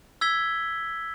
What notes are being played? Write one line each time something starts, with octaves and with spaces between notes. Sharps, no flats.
E6 G#6 B6 G7